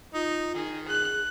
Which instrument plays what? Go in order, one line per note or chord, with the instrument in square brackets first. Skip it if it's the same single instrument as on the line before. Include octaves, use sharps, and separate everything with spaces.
[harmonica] D#4 [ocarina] F4
[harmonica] D#3 [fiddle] G#4
[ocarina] G#4 [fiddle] F#6